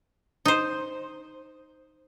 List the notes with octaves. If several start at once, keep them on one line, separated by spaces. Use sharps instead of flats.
D#4 C5